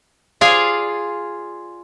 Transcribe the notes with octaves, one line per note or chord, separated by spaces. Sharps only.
F4 G#4 D5 F5 G#5